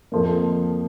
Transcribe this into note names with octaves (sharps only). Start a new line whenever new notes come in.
F2 F3 A#3